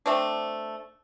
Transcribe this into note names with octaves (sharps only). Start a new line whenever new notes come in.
A3 C4 D4